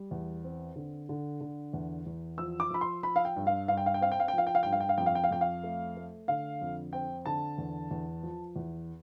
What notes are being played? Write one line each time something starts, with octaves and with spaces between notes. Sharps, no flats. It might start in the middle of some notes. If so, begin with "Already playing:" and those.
Already playing: G3
E2
C4
D3
D3
D3
E2
E2
F3 E6
D6
F3 B5
C6
F3 B5
F5
G5
G2
F5
G2 F5
G5
F5
G5
C4 F5
G5
F5
G5
F3 F5
G5
F5
G2 G5
F5
G5
F5
F2 G5
F5
G5
F5
F2 G5
F5
A3
A3
D3 F5
F2
C4 G5
D3 A5
E2
E2
F3
E2